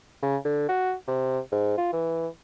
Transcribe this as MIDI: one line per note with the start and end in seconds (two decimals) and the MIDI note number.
0.23 0.37 49
0.45 0.67 50
0.69 0.94 66
1.08 1.39 48
1.52 1.77 44
1.78 1.89 65
1.93 2.27 52